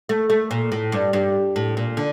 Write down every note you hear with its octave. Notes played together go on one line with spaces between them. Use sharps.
A3
A3
A#2
A2
G2
G2
A2
A#2
D3